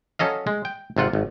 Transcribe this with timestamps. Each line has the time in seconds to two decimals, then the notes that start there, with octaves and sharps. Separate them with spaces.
0.19 F#3 C#4 A4 D#5 F5
0.47 G#3
0.65 G5
0.97 G#1 C3 F4 F#5
1.13 G#1